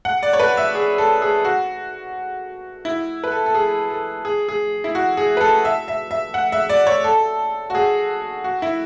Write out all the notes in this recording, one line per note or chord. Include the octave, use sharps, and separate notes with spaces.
F#5
D5
C#5
B4
E5
G#4
A4
G#4
F#4
E4
B4
A4
A4
G#4
A4
G#4
G#4
E4
F#4
G#4
B4
A4
E5
E5
E5
F#5
E5
D5
C#5
A4
F#4
G#4
F#4
E4